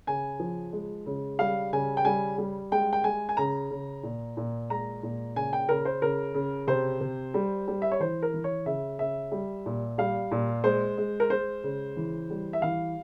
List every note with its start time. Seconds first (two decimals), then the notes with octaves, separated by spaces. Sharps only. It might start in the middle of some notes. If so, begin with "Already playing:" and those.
0.07 C#3 G#5
0.40 F3
0.73 G#3
1.06 C#3
1.39 G3 F5
1.73 C#3 G#5
1.97 G5
2.05 G3 G#5
2.38 G3
2.72 G#3 G5
2.93 G5
3.04 G#3 G#5
3.29 G#5
3.37 C#3 A#5
3.71 C#3
4.03 A#2
4.37 A#2
4.70 G#3 A#5
5.03 A#2
5.36 C#3 G#5
5.53 G5
5.69 C#3 A#4
5.85 C5
6.02 C#3 A#4
6.34 C#3
6.67 C3 C5
7.01 C3
7.34 G3
7.68 G3
7.82 E5
7.91 C#5
8.00 E3 C5
8.22 A#4
8.34 E3
8.44 C#5
8.66 C#3 E5
8.99 C#3 E5
9.32 G3
9.66 A#2
9.98 G3 F5
10.31 A#2
10.64 G#3 C5
10.98 G#3
11.20 A#4
11.30 G#3 C5
11.64 C#3
11.96 E3
12.30 G3
12.53 E5
12.62 E3 F5